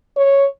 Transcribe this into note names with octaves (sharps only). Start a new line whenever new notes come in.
C#5